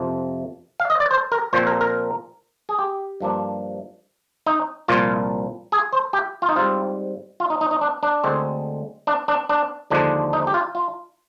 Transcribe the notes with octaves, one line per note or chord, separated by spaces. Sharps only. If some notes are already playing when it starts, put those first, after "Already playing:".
Already playing: F2 C3 F3
F5
D#5
D5
C5
A#4
A#2 F3 C4 C5
A#4
A#4
G#4
G4
G2 F3 A#3 D4
D#4
C2 A#2 F3 F4
G#4
C5
G4
F4
D#4
G#2 G3 C4 F4
F4
D#4
D#4
D#4
D4
D4
D2 D3 G#3 C4
D4
D4
D4
D#2 D3 F3 G#3 D4
D#4
G4
F4
F4